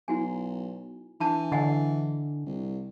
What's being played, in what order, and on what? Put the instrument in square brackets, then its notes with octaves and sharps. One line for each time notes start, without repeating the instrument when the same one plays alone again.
[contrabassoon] B1 [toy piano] E4 F#4 G#5
[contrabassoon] E3 [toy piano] D4 A5 B5
[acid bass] D3 [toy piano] D#5 F#5 G#5
[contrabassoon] C2